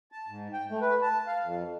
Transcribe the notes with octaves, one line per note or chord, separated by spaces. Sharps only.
A5
G#2
G5
A3
B4
A5
F5
F2